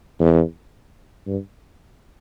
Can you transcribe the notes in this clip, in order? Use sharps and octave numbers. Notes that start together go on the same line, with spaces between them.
E2
G2